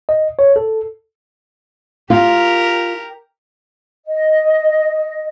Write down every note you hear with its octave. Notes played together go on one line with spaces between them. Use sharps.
D#5
C#5
A4
F4 G4 A#4
D#5